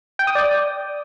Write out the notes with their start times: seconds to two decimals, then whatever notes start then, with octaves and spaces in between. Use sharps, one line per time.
0.19 G5
0.27 D#6
0.35 D5